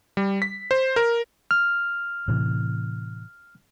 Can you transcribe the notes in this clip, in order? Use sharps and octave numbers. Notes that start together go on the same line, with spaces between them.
G3
B6
C5
A#4
F6
A2 C3 E3